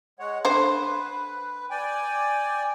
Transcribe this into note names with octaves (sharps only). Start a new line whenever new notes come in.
G#3 C#5 F#5
D3 B4 C5
D5 G5 G#5